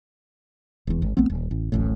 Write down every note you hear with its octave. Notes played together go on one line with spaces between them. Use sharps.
E1 E2
G#1
A#1 A3 B3 C4
D#1
A1
D1 A1 A2